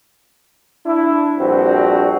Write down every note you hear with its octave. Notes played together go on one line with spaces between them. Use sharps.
D4 E4
A#1 G2 C4 F#4